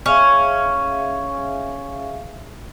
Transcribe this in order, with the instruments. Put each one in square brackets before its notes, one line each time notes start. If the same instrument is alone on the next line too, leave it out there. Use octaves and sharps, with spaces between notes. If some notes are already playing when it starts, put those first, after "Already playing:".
[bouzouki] C#4 [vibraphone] G#4 E5 F5